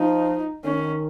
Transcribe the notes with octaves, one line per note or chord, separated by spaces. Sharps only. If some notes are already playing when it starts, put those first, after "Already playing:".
Already playing: F3 D#4
D#3 C#4